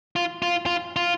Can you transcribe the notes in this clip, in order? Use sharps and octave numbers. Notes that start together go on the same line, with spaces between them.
F4
F4
F4
F4